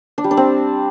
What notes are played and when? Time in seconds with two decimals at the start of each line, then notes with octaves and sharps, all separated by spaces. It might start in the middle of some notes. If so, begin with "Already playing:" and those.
0.18 D4
0.24 G3
0.31 D4
0.37 C4